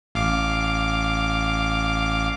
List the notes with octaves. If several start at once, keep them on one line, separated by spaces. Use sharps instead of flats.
A1 F5 D6